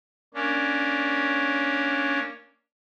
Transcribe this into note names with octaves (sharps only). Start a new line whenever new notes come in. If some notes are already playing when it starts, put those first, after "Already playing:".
A#3 C#4 D4